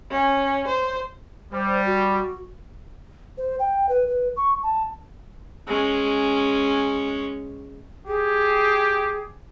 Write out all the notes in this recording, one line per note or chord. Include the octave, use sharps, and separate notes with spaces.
C#4
C5
G3 C5
F#4
C5
G5
B4
B4
C#6
A5
G#3 C#4
G4 G#4